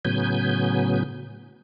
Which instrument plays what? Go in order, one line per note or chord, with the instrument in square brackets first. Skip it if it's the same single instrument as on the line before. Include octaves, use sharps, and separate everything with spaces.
[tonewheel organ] A2 C#3 F#3 B3 G#5 G6